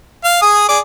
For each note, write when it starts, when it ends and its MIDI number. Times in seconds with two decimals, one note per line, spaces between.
0.24 0.39 77
0.42 0.68 68
0.42 0.68 87
0.69 0.79 68
0.69 0.79 74